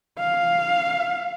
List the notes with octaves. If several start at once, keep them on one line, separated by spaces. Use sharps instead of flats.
F5